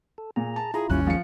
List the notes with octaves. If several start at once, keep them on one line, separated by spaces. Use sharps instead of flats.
A4
A#2 G#4 A#5
A5
E4 F4 G#4 A#5
G#1 D#2 G3 C#4 F#6
G#2 F3 G#3 C#7